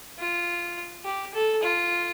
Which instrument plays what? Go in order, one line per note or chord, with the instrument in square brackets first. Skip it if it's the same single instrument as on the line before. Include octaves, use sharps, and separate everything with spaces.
[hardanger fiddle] F4
G4
A4
F4